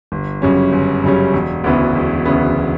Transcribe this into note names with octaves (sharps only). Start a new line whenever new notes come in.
G1
F#2 C#3 G3 C#4
G1
F#2 C#3 G3 C#4
E1
D2 C#3 E3 B3
E1
D2 C#3 E3 B3